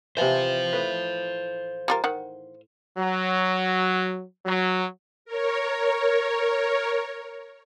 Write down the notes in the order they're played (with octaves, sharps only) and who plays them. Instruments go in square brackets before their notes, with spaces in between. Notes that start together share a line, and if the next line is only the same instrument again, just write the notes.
[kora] C3 E3 [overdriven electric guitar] C5 F5
[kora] A2 B4
[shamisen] G3 F4 A#4
D#3 F#5
[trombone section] F#3
F#3
[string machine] A#4 C#5